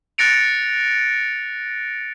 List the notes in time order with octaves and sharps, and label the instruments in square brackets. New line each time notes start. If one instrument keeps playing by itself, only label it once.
[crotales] F#6 A6 A#6 C#7 D7 F7